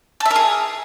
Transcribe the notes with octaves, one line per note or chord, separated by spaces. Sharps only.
A4
E5
A#4
G#4